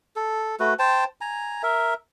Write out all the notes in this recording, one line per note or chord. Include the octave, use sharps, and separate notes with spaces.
A4
A3 F#4 B4
C5 G5 A5
G#5 A#5
A#4 E5